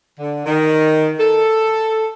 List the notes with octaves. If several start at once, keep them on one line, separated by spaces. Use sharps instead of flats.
D3
D#3
A4